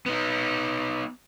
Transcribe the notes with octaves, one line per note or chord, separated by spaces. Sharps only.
B3 D#4